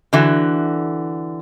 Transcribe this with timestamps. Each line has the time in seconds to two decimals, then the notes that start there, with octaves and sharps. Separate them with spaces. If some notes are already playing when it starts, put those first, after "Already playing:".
0.13 D3 E3 F#4